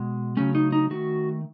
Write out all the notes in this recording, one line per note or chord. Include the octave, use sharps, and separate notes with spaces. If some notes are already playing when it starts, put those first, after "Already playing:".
Already playing: B2 G#3
C#3 F#3 A3 C#4
D#4
D#4
D#3 A3 F#4